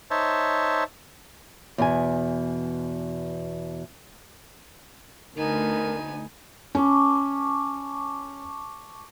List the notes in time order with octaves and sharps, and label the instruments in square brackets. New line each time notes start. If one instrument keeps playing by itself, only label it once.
[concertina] D#4 C5 C#5 E5 A5
[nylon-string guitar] E2 B2 G#5
[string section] D2 [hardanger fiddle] B3 G#5 [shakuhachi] D#4 [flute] A#4
[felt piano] C#4 [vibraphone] A5 C#6 D6